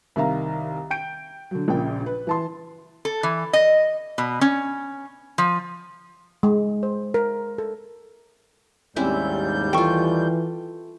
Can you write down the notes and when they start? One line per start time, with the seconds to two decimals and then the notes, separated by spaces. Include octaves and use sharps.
0.16 C2 D#3 E5 F5 A#5
0.90 G5 G6 D7
1.51 D3 F#3
1.68 A#1 A#2 C#3 G5
2.06 B4
2.27 E3 A5 C6
3.05 A4
3.23 E3
3.53 D#5
4.18 B2
4.41 C#4
5.38 F3
6.43 G#3
6.83 C5
7.14 A#4
7.58 A4
8.96 D#2 G#2 G3 C4 C#4 E4 G6
9.73 E3 F4 A4 G5 C#6